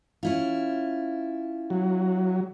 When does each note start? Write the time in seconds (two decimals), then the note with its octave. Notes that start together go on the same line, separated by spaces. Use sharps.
0.23 C#4 E4 F4
1.70 F#3